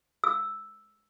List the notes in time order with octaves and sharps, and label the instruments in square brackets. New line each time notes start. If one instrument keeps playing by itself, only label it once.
[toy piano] E6